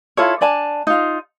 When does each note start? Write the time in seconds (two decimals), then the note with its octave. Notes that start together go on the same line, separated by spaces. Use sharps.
0.17 E4 F4 A4 C#5
0.41 D4 D5 G#5 A5
0.87 D#4 F4